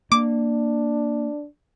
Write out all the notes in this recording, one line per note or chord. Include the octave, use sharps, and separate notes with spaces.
A#3 D4 D6